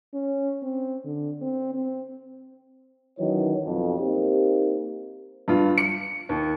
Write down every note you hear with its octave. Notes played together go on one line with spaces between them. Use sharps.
C#4
C4
D3
C4
C4
D#3 E3 F#3 C#4 D#4 C#5
B1 F2
A#3 C4 D#4 G4
G2 F4
C#7
D#2